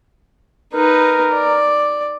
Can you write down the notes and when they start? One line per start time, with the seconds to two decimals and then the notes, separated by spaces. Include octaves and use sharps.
0.74 D#4 A#4 B4
1.33 D5